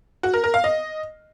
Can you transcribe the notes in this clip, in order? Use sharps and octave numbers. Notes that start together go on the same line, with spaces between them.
F#4
A#4
A#4
F5
D#5